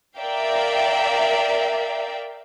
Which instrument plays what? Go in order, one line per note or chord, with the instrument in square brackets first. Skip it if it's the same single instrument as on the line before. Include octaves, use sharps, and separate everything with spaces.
[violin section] A#4 D5 E5 F5 G5